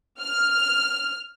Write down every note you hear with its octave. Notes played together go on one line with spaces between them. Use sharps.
F6